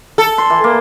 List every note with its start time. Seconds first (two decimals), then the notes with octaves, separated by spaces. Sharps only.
0.18 A4
0.38 C6
0.50 E3
0.64 A#3